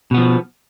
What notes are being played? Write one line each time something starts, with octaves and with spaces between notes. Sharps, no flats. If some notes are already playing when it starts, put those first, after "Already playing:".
B2 F3 B3